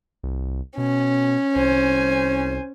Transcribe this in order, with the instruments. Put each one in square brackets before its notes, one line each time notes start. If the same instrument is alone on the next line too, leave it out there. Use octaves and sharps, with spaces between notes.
[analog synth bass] C2
[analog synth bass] B2 [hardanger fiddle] C#4
[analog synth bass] C2 [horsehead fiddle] C5 G#5